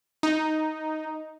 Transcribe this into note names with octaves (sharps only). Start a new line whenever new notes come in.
D#4